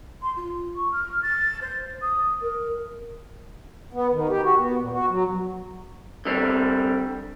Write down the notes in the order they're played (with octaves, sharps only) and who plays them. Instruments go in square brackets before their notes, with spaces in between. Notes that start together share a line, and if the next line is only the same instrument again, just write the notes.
[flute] C6
F4
C#6
F6
A6
C5
D#6
A#4
[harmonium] B3
D#3
G4
F#4
B3
A#2
F#4
F#3
[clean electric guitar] D3 G3 C4